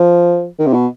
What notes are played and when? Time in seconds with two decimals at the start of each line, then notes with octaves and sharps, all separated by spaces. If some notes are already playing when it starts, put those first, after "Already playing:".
Already playing: F3
0.59 D#3
0.67 C3
0.73 B2